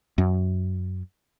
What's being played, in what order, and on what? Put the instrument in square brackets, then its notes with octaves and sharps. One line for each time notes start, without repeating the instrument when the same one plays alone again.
[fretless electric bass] F#2